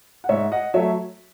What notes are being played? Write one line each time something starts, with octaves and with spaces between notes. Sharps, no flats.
F#5
G#2 C#5 E5
D#5 F#5
F#3 A3 C#5 E5